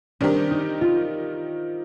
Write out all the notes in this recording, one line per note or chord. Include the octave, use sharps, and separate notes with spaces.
D#3 G3 C4 D4 G4 A#4
D#4
F4